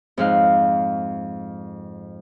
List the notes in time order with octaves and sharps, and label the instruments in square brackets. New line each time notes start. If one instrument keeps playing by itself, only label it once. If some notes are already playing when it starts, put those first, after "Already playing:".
[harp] F2 G#2 F5 F#6